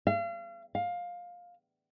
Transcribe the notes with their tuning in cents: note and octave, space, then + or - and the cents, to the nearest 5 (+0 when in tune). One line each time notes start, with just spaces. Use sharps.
F5 -40
F5 +15